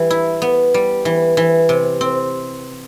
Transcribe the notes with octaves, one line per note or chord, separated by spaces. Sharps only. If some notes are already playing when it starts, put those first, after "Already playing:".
Already playing: E3 G3
E4
B3
G3
E3
E3
C3
C4